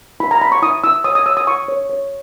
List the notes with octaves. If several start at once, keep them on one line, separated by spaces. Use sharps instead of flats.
E4 B5
A#5
E4 B5
C#6
E4 D#6
E4 E6
C#5 D#6
D#6
C#5 E6
D#6
E4 C#6
C#5
C#5